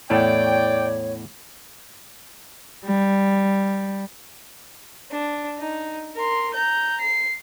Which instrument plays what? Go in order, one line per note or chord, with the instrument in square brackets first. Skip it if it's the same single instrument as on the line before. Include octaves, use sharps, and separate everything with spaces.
[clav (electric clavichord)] E2 A2 A3 [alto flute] C#5 [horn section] D5 G5
[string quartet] G3
[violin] D4
D#4
A#4 C6
A#5 G6
C7